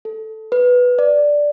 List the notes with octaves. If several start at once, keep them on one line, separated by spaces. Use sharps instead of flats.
A4
B4
D5